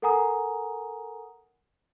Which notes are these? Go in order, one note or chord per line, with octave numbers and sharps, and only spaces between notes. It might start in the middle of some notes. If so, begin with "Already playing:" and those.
A4 A#4 F#5 G#5 A#5 D#6